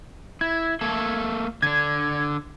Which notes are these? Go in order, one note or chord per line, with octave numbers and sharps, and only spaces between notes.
E4 G#6
A3 A#3 A4
D3 D4 G#6